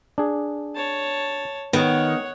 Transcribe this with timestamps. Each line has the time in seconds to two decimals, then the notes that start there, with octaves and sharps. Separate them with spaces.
0.18 D4 G#4
0.75 C#5 A5
1.73 D#3 B3 C#5 F#5